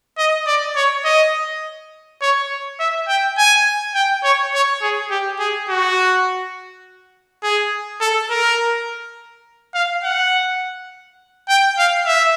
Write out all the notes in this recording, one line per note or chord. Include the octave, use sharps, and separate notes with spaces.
D#5
D5
C#5
D#5
C#5
E5
G5
G#5
G5
C#5
C#5
G#4
G4
G#4
F#4
G#4
A4
A#4
F5
F#5
G5
F5
E5